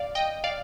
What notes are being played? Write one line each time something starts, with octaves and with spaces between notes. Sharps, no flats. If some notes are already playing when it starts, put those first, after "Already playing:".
Already playing: D5 F5
D#5 G5
D5 F5